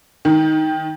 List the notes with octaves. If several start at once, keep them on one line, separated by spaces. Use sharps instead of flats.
D#3